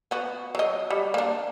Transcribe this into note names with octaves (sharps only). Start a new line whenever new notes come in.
B3 F#4
F#3 D#5
G3
A#3 D4